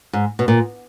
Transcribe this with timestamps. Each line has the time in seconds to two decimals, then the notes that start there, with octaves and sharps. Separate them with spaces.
0.13 G#2
0.39 B2
0.48 A#2